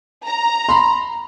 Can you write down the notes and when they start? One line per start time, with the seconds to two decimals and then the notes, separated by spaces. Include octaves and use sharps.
0.26 A#5
0.69 B5 C6